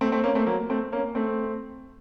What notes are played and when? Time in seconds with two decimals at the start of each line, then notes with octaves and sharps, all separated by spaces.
0.01 A3 C4
0.12 A3 C4
0.24 A#3 C#4
0.35 A3 C4
0.47 F#3 A#3
0.70 A3 C4
0.92 A#3 C#4
1.15 A3 C4